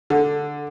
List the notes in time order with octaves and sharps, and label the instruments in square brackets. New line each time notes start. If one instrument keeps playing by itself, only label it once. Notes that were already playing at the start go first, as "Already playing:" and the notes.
[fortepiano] D3